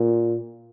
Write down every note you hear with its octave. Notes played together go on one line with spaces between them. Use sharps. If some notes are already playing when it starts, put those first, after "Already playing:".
Already playing: A#2